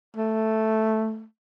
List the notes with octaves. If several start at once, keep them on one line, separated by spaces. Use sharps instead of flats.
A3